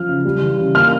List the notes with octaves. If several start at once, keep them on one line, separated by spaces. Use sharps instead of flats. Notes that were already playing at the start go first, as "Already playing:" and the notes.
Already playing: F#2 F3 F6
C#3
G3
E3
C#3
A#3 F6